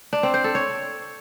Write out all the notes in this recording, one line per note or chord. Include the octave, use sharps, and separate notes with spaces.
D4
C4
C5
A4
C#5